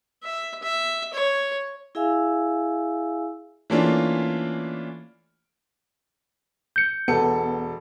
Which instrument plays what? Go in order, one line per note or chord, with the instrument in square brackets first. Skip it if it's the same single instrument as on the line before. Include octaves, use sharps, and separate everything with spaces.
[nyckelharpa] E5
E5
C#5
[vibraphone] E4 G#4 E5 F5 G#5 E6
[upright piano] E3 A3 A#3 C#4 D4 F4
[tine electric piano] G6 C#7
[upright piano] E1 A4 C#7 [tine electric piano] B3